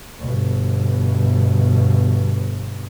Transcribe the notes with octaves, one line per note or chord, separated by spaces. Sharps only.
G1 B2